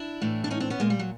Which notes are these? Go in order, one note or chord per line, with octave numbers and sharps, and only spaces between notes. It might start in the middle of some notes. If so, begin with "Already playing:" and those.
Already playing: D4 E4
A2 E3
D4
C#4 D#4
C4 D4
B3 C#4
A#2 G#3 A#3
G3
F#3